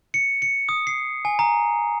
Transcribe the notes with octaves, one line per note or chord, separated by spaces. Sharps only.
C#7
C#7
D#6
C7
G#5
A#5